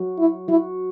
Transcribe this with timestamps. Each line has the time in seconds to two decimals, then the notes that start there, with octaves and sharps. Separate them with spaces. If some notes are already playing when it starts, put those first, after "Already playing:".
Already playing: F#3 F#4
0.19 E4
0.48 F#3 E4 F#4